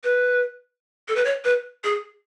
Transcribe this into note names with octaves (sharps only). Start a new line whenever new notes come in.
B4
A4
B4
C#5
B4
G#4